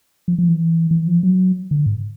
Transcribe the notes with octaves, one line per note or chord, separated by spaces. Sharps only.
F3
F3
E3
E3
F3
F#3
D3
G#2